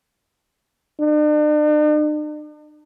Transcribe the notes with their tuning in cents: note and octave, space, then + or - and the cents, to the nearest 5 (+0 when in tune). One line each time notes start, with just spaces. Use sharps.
D4 +45